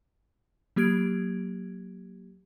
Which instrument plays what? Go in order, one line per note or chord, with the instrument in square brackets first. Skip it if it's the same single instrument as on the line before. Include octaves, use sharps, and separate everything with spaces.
[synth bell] F#3 A#3 G4 G#6 D7